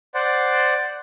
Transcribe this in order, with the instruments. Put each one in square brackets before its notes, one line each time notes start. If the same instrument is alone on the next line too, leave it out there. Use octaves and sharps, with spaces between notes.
[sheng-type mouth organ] C5 D5 F#5